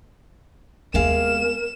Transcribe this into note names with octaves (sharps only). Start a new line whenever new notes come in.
D#2 C3 G#3 B3 A#4 F5 E7